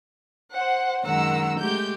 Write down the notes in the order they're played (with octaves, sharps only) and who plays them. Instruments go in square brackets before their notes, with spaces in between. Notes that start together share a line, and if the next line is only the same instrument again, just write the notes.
[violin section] C5 F#5
[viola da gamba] F#2 D#3 G#3 [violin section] F#5 A#5 E6
[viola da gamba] G#3 A3 G4 [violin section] G6